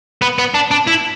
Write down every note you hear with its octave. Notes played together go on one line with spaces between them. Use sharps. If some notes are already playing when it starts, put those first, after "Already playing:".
B3
B3
D4
D4
E4